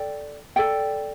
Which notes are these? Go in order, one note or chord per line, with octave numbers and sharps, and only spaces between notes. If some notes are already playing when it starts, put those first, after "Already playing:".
Already playing: A4 D5 G5
A4 D5 G5